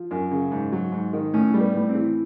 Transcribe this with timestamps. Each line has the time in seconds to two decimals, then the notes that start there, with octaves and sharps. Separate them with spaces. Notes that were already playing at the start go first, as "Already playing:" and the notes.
Already playing: F3
0.11 F#2
0.31 C#3
0.52 G#2
0.72 F#3
0.92 G#2
1.13 D#3
1.34 A2 C#4
1.54 G3
1.61 B3
1.75 A2
1.89 C4
1.95 E3